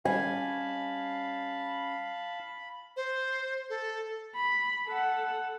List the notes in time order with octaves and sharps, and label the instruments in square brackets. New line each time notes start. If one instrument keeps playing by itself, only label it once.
[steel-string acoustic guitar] G3 C#4 [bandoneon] F5 A5 [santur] G#5 [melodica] B5
[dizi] C5
A4
[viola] B5
A4 F#5